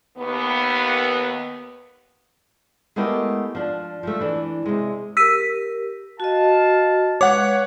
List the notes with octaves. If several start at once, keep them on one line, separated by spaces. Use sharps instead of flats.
D#2 B3
G#3 A3 B3 E4 G4 A#4
F3 D4
F3 G3 A3
E3 D4
C3 G#3
G4 A#4 E6 B6 D#7
F#4 D#5 F5 A5
G#3 B4 C#5 F5 F#5 D6